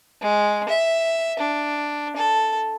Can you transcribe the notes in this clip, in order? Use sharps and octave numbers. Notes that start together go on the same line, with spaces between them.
G#3
E5
D4
A4